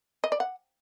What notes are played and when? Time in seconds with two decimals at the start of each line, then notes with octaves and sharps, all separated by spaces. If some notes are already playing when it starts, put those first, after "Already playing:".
0.24 D#5
0.32 D5
0.40 F#5